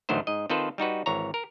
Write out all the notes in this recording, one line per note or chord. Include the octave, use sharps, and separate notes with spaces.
A1 D2 D#3 F#3 A3 C5
G#2 D#5
D#3 C4 F4 A4 B4 C5
G3 D#4 F#4 B4
G#1 E3 C#5 A#5
A#4